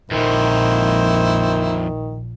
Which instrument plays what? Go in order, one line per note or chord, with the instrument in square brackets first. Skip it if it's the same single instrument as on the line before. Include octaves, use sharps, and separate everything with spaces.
[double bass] A#1 [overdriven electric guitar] F2 A#2 [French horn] D#3 [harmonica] E4 C5